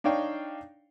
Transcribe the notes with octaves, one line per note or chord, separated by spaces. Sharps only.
D4 D#4 C#5 F5 G5